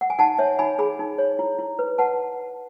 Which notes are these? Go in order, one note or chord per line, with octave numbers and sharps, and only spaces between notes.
F#5
G#5
D#4 F#5 A5
C#5 E5 G#5
D#4 G#5 B5
G#4 G#5 B5
D#4
C#5
E4
E4
B4
B4 F#5 A5